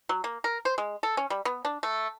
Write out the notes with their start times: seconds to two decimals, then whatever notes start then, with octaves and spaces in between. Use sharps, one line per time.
0.09 F#3
0.24 A#3
0.44 A#4
0.65 C5
0.78 G#3
1.03 A4
1.17 C#4
1.30 G3
1.45 B3
1.65 D4
1.83 A3